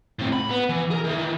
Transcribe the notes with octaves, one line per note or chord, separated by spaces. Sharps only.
A2 C4
B5
B3
E3
G#4 A#4
D#3 E3